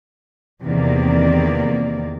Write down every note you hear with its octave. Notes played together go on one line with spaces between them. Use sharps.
E2 C3 D#3 A#3 D5